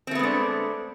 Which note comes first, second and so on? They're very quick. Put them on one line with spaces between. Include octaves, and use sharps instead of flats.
C4 A3 B3 G#3 D4